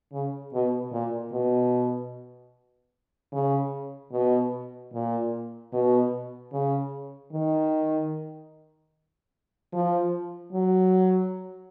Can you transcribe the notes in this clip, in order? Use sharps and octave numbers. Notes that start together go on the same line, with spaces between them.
C#3
B2
A#2
B2
C#3
B2
A#2
B2
C#3
D#3
F3
F#3